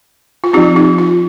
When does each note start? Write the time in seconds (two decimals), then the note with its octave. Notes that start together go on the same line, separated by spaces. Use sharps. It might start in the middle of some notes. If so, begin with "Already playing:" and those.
0.44 F4
0.53 C4 D#4 G4
0.57 F3
0.76 D#4
0.98 F4